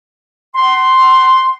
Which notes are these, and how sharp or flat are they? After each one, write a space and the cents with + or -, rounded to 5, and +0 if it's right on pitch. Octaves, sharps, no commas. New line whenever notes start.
F#5 +30 C6 +0